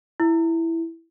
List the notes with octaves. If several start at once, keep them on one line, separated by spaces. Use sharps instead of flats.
E4